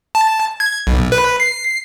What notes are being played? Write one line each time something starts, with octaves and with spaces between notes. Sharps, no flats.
A5
G#6
B1
B4
C7